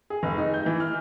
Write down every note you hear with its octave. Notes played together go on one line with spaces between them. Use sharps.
G#4
F1
D#4
G6
E3
F6